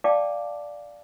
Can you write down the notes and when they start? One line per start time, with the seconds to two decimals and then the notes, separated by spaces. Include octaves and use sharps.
0.04 D5 F5 G5 A5 D6